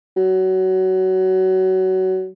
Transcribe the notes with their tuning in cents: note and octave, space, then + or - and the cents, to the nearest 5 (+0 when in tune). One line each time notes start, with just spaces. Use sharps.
F#3 +20